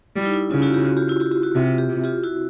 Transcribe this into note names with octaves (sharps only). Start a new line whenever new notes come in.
G3 E4
D#4
E4
C#3 F4
E4 F#4
F4 G4
E4 F#4
F4 G4
E4 F#4
F4 G4
F4 G4
E4 F#4
C3 F4
G4
C3
F4 G4
E4 F#4